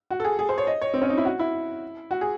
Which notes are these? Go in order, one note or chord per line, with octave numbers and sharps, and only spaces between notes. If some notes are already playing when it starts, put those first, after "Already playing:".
F#4
A4
G#4
G#4
C5
C#5
D#5
C#5
C4
C#4
D#4
E4
F#4
E4
F#4
G#4